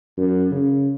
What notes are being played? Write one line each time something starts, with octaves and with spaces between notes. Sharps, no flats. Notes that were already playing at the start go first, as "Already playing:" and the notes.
F#2
C#3